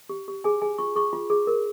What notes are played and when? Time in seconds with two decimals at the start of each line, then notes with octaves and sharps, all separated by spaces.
0.09 G4
0.28 G4
0.44 G#4 G#5
0.62 G#4 G#5
0.78 F4 C#6
0.96 G#4 C#6
1.13 F4
1.30 G#4
1.47 A#4